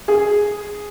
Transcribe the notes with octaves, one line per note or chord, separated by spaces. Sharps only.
G#4